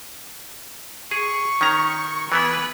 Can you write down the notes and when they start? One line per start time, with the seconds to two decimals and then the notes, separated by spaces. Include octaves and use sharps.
1.11 G#4 C#6
1.61 D#3 C#4 A#5
2.32 E3 B3 E4 B4